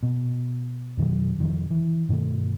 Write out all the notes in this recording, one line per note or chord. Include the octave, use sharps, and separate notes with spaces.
B2
F2 B2 D#3 F#3
F1 D#3 F3
E3
G2 B2 D#3 A3